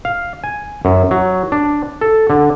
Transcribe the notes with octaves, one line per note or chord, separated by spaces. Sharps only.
F5
G#5
F#2
F#3
D4
A4
D3